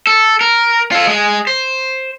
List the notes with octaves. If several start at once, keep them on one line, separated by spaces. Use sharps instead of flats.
A4
A#4
F4 A4
G#3 G#4
C5